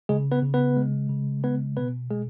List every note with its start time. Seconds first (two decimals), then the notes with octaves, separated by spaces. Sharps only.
0.09 C#3 G#3 G#4
0.32 B3 B4
0.42 C#3
0.54 B3 B4
0.76 G#3
1.09 C#3
1.44 G#3 B3 B4
1.77 B2 B3 B4
2.11 B2 G#3 G#4